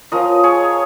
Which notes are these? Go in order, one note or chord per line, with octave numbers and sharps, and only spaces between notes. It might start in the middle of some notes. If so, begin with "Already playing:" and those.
F3 C#4 F4 A#4 D#5
G#4 C#5